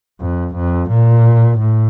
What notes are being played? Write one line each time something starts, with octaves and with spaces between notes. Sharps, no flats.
F2
F2
A#2
A2